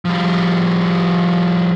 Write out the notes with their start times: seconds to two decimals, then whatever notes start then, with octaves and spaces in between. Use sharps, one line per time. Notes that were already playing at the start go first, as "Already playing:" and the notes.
0.05 F3 G3